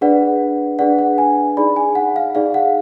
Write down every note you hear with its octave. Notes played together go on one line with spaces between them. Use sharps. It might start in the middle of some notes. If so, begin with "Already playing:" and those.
D4 G#4 B4 D5 F#5
D4 G#4 B4 D5 F#5
F#5
G#5
D#4 G#4 D5 B5
G#5
F#5
F5
D#4 G#4 D5 F5
F#5